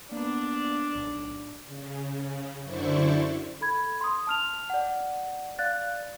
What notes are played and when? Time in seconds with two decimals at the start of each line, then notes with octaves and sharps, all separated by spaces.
0.12 A#3 B3 D4
0.95 B1 A2
1.67 C#3
2.64 F#2 D3 E4 C5 D5 C#6
3.61 A4 B5 G#6
4.01 C6 D#6
4.27 A5 F6 F7
4.70 D5 F#5
5.59 D5 F5 F#6 A6